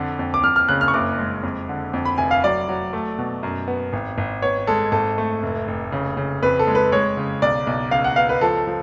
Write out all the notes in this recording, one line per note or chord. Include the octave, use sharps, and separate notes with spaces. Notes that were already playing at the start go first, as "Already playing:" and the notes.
Already playing: F2 D3
F2
D6
F2 F6
F6
C#3 F#6
F6
C#6
F#1 D6
G#3
F2
D3
F2
B5
F1 G#5
F5
F#3 D5
F#3
A3
B2
F#2
B3
G#1
G#1
B3 C#5
G#3 A4
G#1 A4
A3
F1
F1
C#3
C#3
F2 B4
A4
G#3
B4
G#3 C#5
C#3
B1 D5
B1
C#2 F5
F#5
B3 F5
B4
F3 A4
F3